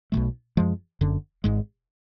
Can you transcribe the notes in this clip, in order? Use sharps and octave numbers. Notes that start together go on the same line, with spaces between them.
B1 B2 F#3 A3
F#2 F3 G#3
F#1 F#2 D3
G#1 G#2 G#3